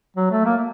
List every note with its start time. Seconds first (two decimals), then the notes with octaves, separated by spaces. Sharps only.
0.17 F#3
0.31 A3
0.45 A#3